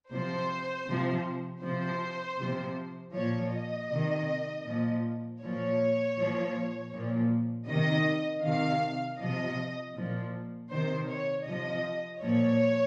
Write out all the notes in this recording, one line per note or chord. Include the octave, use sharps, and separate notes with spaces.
C3 F3 C5
C3 F3
C3 F3 C5
C3 F3
A#2 F3 C#5
D#5
C3 D#3
A#2 F3
A#2 F3 C#5
A#2 F3
A#2 F3
C3 D#3 D#5
C3 D#3 F5
C3 F3 D#5
A#2 F3
C3 D#3 C5
C#5
C3 F3 D#5
A#2 F3 C#5